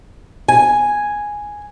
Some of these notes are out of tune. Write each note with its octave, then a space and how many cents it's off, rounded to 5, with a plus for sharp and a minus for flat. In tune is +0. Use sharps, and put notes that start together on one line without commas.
G#5 +0